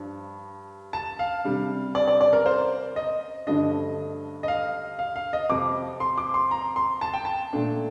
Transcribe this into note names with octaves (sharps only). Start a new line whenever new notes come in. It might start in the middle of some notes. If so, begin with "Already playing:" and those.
Already playing: G2 F3 D4
A5
F5
C3 G3 D4
D5
D5
D5
A#4
C5
D#5
G2 D3 F3 A3 D4 D#5
D#5
F5
F5
F5
D#5
F2 C3 F3 D6
C6
D6
C6
A#5
C6
A5
G5
A5
A#2 A3 D4